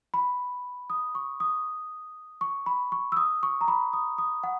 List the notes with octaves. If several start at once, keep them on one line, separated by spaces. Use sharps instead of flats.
B5
D#6
C#6
D#6
C#6
B5
C#6
E6
D#6
C#6
A#5
B5
D#6
D#6
F#5